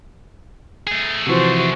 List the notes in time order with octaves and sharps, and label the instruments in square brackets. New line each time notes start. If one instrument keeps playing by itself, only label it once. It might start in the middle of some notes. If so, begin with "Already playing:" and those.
[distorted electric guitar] A3 G#4
[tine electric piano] C3 E3 F3 [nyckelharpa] F#4 C5